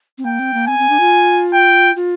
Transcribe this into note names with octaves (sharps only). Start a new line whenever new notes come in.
C4
A#3 G5
C4
A#3
C4 G#5
C4
D4
F4
G5
F4